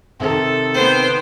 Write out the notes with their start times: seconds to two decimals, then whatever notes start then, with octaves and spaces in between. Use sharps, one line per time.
0.20 C3 D#3 A4
0.74 B3 C5 G5